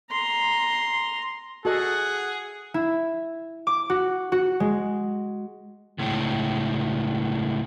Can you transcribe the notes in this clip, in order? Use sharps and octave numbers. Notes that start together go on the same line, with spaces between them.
A#5 C6
F#4 G#4 A4 D#5 F#5
E4
D6
F#4
F#4
G#3
C#2 A2